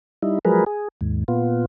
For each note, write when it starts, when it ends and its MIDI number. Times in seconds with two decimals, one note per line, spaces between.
0.23 0.39 55
0.23 0.39 63
0.23 0.39 64
0.45 0.64 53
0.45 0.64 54
0.45 0.64 56
0.45 0.64 68
0.45 0.64 70
0.45 0.64 71
0.66 0.88 68
1.01 1.24 39
1.01 1.24 44
1.28 1.65 46
1.28 1.65 59
1.28 1.65 65